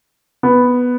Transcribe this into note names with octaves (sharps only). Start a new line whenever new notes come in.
B3